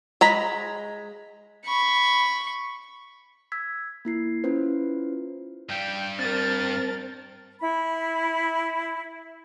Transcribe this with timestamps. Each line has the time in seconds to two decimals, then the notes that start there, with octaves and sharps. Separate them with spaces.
0.21 G#3 A#5 B5
1.66 B5 C#6
3.52 E6 G#6 B6
4.05 A#3 E4 C7
4.44 C#4 E4 F4 B4 C5
5.69 G2 G3 G5
6.19 C4 A#4 A5 A6
7.60 E4 B5